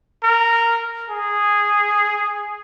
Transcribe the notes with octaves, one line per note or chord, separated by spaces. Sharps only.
A#4
G#4